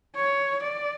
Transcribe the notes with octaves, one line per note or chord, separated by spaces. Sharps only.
C#5
D5